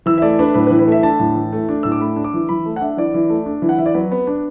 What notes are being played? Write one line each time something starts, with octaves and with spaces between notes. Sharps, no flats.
E3 E6
E5
A3 D5
D4 B4
A2 B4
B4
E3
B4
A3 E5
D4 A5
A2
E3
A3
D4
A2 E6
D6
A3 B5
D4
D6
E3
E3 B5
A3
F#5
D4 E5
E3 D5
E3
A3
D4
E3
F#5
E3 E5
D5
F#3 B4
B3
D4